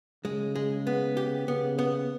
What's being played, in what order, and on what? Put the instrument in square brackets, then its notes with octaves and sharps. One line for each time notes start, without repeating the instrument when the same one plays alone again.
[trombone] C#3 [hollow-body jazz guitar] G#3
[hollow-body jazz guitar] G#3
B3
G4
[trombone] C#3 [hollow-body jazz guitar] B3
[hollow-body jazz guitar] B3